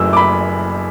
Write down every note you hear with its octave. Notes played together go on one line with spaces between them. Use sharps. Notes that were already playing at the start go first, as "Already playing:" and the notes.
Already playing: F#1 F#2 E3 A3 E6
D6
B5